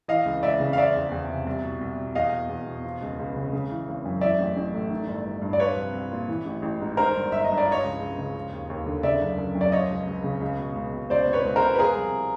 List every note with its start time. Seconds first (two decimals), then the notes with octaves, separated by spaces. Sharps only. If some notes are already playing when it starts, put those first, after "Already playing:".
0.08 E3 D#5 F5
0.25 C#2
0.43 C#2 D5 E5
0.60 C#3
0.73 F5
0.77 F3 D5 E5
0.95 E2
1.11 E2
1.30 C3
1.47 C2
1.64 B2
1.81 C2
1.98 B2
2.15 E2 D#5 F5
2.32 B2
2.49 E2
2.67 B2
2.84 F3
3.02 C#2
3.18 C#2
3.36 C#3
3.53 C#3
3.70 E3
3.88 G#1
4.05 F#2
4.21 E3 D5 E5
4.39 A1
4.57 A1
4.74 A2
4.90 D#3
5.07 G1
5.25 G1
5.42 G2
5.53 D5
5.60 F3 B4 C#5
5.77 C2
5.93 C2
6.12 A#2
6.28 E3
6.45 A1
6.62 A1
6.80 G#2
6.97 D#3 A#4 C5
7.15 G1
7.31 G1 E5
7.44 D#5
7.50 G2
7.58 D5
7.66 F3
7.71 C#5 D#5
7.84 C#2
8.00 C#2
8.18 C#3
8.34 F3
8.52 D#2
8.70 D#2
8.86 D3
9.03 C#3 D5 E5
9.21 F#1
9.38 F#1
9.55 F#2
9.61 D5
9.72 F3 C#5 D#5
9.91 C#2
10.07 C#2
10.24 C#3
10.41 C#2
10.59 B2
10.75 C#2
10.93 B2
11.10 C#2 C5 D5
11.27 B2
11.33 B4 C#5
11.45 C#2
11.56 A#4 C5
11.63 B2
11.75 B4
11.79 F3 G#4 A#4
11.96 C2